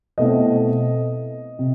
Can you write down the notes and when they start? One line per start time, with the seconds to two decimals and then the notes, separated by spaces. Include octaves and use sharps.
0.18 B2 A3 C4 E4 D#5
1.59 C3